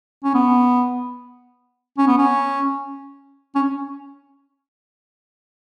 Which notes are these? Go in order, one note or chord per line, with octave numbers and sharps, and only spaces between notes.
C#4
B3
C#4
B3
C#4
C#4